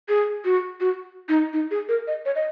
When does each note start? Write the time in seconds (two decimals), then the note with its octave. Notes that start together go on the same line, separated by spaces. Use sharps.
0.09 G#4
0.45 F#4
0.80 F#4
1.29 D#4
1.53 D#4
1.71 G#4
1.89 A#4
2.07 D#5
2.26 C#5
2.35 D#5